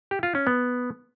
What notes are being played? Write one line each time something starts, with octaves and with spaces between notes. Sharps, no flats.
G4
F4
C#4
B3